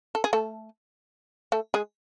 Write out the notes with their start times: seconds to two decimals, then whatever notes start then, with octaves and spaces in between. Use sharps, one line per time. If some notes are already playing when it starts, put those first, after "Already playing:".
0.15 A4
0.24 G#4
0.33 A3 A4
1.52 A3 A4
1.74 G#3 G#4